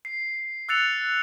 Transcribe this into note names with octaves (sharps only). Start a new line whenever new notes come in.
C7
E6 F#6 A6 C#7 F7